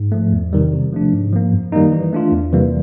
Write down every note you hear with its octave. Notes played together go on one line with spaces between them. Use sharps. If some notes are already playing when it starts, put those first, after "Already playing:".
Already playing: G#2
F3 A3
E2
C3 D#3 G3
C3
F3 A3 D4
G#2
F3 A#3
F#2
D#3 G3 A#3 D#4
E3
A3 D4 F4
E2
C3 E3 G3 A#3